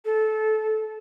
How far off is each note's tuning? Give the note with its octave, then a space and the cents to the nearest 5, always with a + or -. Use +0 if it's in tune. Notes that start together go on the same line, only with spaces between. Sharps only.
A4 -20